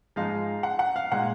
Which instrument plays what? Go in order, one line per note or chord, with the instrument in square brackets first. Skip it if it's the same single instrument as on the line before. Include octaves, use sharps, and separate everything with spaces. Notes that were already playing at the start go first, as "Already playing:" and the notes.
[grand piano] G#2 F3 G#3 D#4 F5
F#5
F#5
F5
A#2 G#3 D#4 F#5